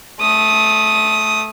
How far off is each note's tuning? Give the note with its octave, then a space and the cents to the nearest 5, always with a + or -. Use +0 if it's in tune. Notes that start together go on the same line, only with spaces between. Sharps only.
A3 -15 D#6 +5